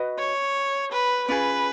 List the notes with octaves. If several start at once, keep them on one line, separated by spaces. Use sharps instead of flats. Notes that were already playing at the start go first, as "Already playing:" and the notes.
Already playing: F#4 B4 D#5
C#5
B4
C#4 F4 G#4 B4